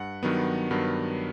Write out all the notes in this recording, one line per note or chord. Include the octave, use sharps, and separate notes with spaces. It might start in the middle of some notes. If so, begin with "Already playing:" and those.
Already playing: G2 F#5
G2 D#3 F#3 B3
G2 D#3 F#3 B3